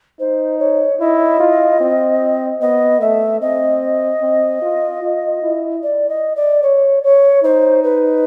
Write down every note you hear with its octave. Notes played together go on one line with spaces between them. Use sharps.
D#4 C5
C#5
E4 D#5
F4
C4
B3 D#5
A3 E5
C4 D#5
C4
F4
F4
E4
D5
D#5
D5
C#5
C#5
D#4 C5
B4